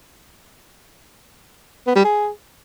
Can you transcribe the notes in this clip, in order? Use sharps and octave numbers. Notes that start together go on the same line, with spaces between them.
B3
G3
G#4